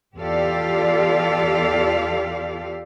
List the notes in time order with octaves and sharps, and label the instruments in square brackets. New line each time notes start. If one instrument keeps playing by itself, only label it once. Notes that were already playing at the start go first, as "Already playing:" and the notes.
[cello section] E2 F4 G4 A4 D5 F5